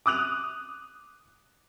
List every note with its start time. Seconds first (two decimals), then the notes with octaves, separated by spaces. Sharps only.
0.06 D6 D#6 F#6 F7